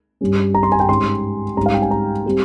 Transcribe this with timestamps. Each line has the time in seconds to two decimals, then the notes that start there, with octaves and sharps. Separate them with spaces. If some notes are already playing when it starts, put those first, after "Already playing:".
0.21 G2 G3 C#4
0.55 A#5
0.63 C6
0.72 G#5
0.80 G5
0.89 G#2 G3 C#4 C6
1.57 G#2 G3 C#4 A#5
1.66 F5
1.74 G5
1.82 G#5
1.91 A#5
2.26 G3 C4